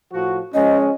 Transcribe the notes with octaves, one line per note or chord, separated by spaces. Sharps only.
A2 F3 F#4
F3 G#3 C#4 D#5